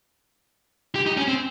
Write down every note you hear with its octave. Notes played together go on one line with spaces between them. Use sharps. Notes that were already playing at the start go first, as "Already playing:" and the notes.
G4
D#4
C#4
C4